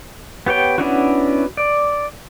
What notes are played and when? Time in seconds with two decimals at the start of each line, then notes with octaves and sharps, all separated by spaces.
0.46 B3 G4 C#5 G5
0.78 B3 C#4 D4 E4 F#4
1.57 D5